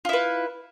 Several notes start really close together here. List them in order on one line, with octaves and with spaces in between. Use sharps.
F4 E4 B4